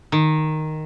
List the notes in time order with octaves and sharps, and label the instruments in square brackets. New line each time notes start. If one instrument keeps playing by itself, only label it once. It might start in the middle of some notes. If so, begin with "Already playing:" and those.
[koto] D#3